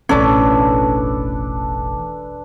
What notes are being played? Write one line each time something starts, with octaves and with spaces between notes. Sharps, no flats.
E1 A1 C#4 D4 A4 B4 D5